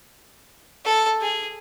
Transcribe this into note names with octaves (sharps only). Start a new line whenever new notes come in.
A4
G#4